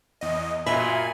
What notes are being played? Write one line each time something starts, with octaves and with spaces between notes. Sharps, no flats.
E2 D#5
F#2 A#2 D#5 E5 G#5 B5 B6 F#7